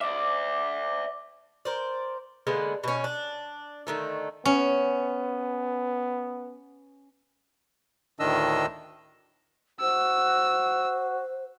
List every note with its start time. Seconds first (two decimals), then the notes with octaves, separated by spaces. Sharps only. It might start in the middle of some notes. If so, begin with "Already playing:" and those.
0.01 D5 E5 D6
1.65 A#4 C5 D5
2.47 D3 G#3 A#3 B3
2.84 B2 C#4
3.04 D4
3.87 D3 D#3 A3
4.45 B3 C#4
8.19 D2 A2 D#3 D4 D#5 E6
9.80 F#4 C5 E6